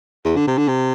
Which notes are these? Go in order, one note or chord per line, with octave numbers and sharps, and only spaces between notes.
E2
D3
C3
D3
C3